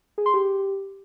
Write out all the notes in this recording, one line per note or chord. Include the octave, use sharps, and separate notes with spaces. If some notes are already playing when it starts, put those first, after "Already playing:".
G#4
C6
G4